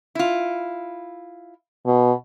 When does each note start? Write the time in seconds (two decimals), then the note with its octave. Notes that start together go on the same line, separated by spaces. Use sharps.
0.15 E4 F4
1.86 B2